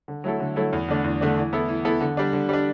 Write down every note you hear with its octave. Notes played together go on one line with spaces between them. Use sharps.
D3
F#3 A3 E4 A4
D3
F#3 A3 E4 A4
E2
D3 A3 D4
E2
D3 A3 D4
E3
B3 E4 A4
E3
B3 E4 A4
D3
G3 D4
D3
G3 D4